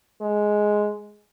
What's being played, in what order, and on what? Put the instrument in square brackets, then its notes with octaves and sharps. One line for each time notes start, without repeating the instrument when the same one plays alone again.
[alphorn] G#3